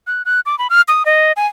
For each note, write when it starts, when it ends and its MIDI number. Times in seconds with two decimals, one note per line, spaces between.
0.07 0.22 90
0.25 0.40 90
0.46 0.58 86
0.59 0.68 83
0.70 0.81 89
0.88 1.05 87
1.06 1.32 75
1.36 1.46 80